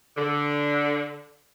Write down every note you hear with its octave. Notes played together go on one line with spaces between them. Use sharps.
D3